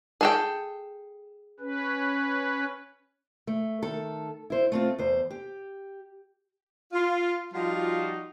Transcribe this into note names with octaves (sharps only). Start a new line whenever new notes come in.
G#4 A4 G5
C#4 B4
A3
D#3 A4
E4 C5
A3 C4 F4
E2 C5
G4
F4
F3 G3 D#4 F4 F#4